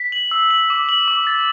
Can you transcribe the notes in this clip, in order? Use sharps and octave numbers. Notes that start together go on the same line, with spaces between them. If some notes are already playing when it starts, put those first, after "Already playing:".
Already playing: B6
F#7
E6
F#7
D6
F#7
D6
A6